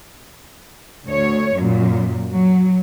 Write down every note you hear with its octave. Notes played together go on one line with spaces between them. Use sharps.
D2 C#5
F#2 A#2
F#3